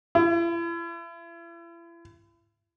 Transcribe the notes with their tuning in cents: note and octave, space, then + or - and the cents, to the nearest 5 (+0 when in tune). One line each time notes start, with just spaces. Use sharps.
E4 +40